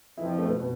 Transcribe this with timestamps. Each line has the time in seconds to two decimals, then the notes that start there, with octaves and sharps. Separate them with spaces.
0.18 F2 C3 E3 F3 E4
0.39 A3
0.45 B2 B3
0.59 B2 B3